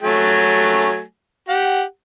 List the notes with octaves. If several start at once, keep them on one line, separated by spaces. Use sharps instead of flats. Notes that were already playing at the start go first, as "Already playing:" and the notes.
F#3 A3 G#5
G4 F#5